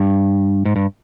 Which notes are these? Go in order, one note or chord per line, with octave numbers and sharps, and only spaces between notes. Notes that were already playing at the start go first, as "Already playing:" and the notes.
Already playing: G2
G#2
G2